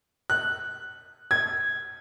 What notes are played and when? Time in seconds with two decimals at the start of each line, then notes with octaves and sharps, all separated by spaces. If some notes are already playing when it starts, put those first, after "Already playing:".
0.30 F#6
1.31 G#6